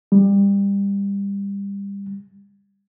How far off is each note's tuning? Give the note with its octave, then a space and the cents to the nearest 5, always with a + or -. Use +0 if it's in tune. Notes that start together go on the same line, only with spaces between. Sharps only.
G3 +25